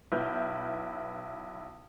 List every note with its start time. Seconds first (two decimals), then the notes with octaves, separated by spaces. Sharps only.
0.12 B1 E4 B4 F6 G6